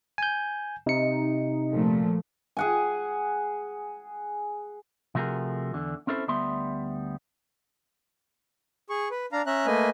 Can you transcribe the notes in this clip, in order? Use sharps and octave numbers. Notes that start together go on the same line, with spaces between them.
G#5 G6
C3 D#4 C#7
A#2 F3 A3
G#4 F#5 G#5
C3 F3 A3 F#4 G#4 A#4
E2 D3
C4 C#4 E4 A4 C5
D2 G3 B3 E5 C6
G#4 C#6
B4
D4 F5 A#5
C#4 E5 A#5 F#6
A3 A#3 B4 D#5 G#5